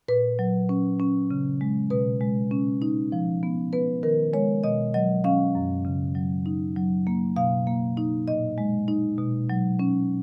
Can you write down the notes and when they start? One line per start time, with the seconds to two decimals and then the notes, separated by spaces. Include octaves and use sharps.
0.08 A#2 B4
0.39 F#3
0.69 C#4
1.00 C#4
1.31 C#3
1.61 G#3
1.90 B2 B4
2.21 G#3
2.51 C#4
2.82 D#4
3.12 F3
3.43 B3
3.73 B3 B4
4.03 D#3 A#4
4.33 G#3 C#5
4.64 B2 D#5
4.94 F#3 D#5
5.24 C#4 F5
5.55 F#2
5.85 C#3
6.15 F#3
6.46 D#4
6.76 F#3
7.07 A#3
7.36 B2 F5
7.67 A#3
7.97 D#4
8.28 A#2 D#5
8.58 G#3
8.88 D#4
9.18 B2
9.50 F#3
9.79 C#4